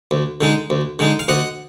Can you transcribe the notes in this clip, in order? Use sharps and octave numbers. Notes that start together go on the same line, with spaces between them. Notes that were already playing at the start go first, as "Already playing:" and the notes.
D2
D3 G#3 D#4
D2
D3 G#3 D#4
F5
D2 D#5 F#5